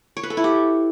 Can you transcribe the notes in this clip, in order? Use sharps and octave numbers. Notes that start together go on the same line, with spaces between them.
C#5
B4
A4
E4
G4